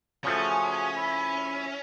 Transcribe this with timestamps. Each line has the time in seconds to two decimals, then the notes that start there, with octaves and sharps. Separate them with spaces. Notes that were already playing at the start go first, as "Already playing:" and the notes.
0.24 C#3 F3 A3 C#4 F#4 G#4 G#5
0.96 E4 B5